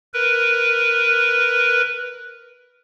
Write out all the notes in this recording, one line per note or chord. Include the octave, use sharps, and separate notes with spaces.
A#4 B4